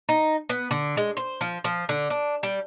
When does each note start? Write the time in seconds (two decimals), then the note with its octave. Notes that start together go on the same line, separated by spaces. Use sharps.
0.09 D#4
0.49 B3
0.71 D3
0.97 G#3
1.17 C5
1.41 F3
1.64 F3
1.89 D3
2.10 D4
2.43 G3